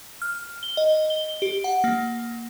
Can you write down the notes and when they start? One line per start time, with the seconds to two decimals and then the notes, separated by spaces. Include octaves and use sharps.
0.22 F6
0.63 G7
0.77 D#5
1.10 G7
1.42 G4
1.64 F#5
1.84 A#3